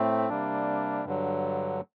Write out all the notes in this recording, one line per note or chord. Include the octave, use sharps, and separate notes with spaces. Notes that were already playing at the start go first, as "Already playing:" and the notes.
Already playing: A2 A3 C4
C3 G3 A#3 D4
G2 D3 F#3